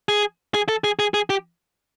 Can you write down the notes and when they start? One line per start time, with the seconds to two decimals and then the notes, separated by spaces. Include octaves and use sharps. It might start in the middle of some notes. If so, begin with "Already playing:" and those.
0.09 G#4
0.54 G#4
0.69 A4
0.84 G#4
0.99 G#4
1.14 G#4
1.30 G4